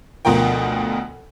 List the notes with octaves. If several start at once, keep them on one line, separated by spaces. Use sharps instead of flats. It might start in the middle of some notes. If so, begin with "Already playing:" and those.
D2 B2 F3 A#4 G5